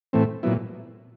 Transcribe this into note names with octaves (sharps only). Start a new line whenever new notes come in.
A2 E3 A3 C4
A#2 F#3 B3 E4